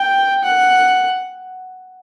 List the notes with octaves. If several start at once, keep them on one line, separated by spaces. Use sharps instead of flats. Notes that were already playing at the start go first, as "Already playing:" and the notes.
Already playing: G5
F#5